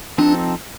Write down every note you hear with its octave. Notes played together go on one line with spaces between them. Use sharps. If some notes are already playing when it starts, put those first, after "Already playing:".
F3 C4 D4 D#4 A4